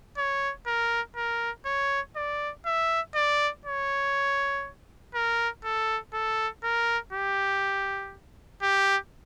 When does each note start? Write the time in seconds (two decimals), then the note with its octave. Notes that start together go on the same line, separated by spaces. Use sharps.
0.18 C#5
0.67 A#4
1.16 A#4
1.66 C#5
2.16 D5
2.66 E5
3.15 D5
3.66 C#5
5.14 A#4
5.64 A4
6.14 A4
6.63 A#4
7.13 G4
8.62 G4